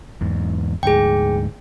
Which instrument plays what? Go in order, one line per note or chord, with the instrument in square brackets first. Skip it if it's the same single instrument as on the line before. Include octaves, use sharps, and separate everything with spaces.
[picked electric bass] E2 G#2
[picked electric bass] D2 G#2 [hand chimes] G#4 G5